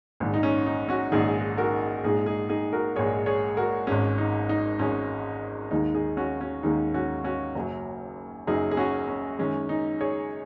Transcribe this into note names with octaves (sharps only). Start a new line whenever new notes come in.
A#1 G#2 D#3
D#4
C#4
D#4
C#4 F#4
A#1 G#2 D#3 D#4 G#4
F#4 A#4
A#1 G#2 G#3 D#4 G#4
D#4 G#4
D#4 G#4
F#4 A#4
A#1 G#2 G#3 G#4 C#5
G#4 C#5
F#4 A#4
G#1 G#2 G#3 C#4
D#4
D#4
G#1 G#2 G#3 C#4
D#2 D#3 G#3 D#4
D#4 G#4
C#4 F#4
C#4 F#4
D#2 D#3 G#3 D#4
C#4 F#4
C#4 F#4
F#1 F#2 F#3
F#1 F#2 F#3 D#4 G#4
G#4
C#4 F#4
C#4
F#2 D#3 G#3 C#4
D#4
G#4 C#5